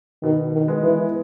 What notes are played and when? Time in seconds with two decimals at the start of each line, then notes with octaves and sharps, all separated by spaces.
0.23 B2 D#3
0.53 D#3
0.68 G#3 B3
0.83 E3